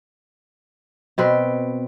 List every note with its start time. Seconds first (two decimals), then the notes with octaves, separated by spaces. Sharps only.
1.18 B2 C4 B4